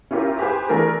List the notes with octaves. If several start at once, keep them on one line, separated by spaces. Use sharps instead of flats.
C#4 E4 F4 G4 A#4
G4 G#4 B4 C5 G#5
E3 A3 D4 G#4 A#4 B4